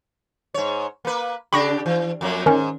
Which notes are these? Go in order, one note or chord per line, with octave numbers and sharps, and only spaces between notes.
G#2 C#5
A#3 B4
C#3 D4 G4 B5 C#6 A#6
E3
F2 F#3 A#3
G#2 D#3 C#4